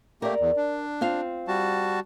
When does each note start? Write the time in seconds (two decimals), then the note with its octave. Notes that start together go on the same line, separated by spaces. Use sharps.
0.22 A3 A#3 G4 A#4 D5
0.40 E2
0.57 D4
1.01 C4 F4 F5
1.48 G3 F#4 A5